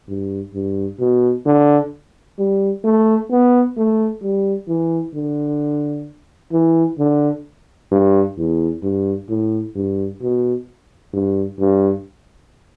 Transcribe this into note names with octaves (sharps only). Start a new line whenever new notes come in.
G2
G2
B2
D3
G3
A3
B3
A3
G3
E3
D3
E3
D3
G2
E2
G2
A2
G2
B2
G2
G2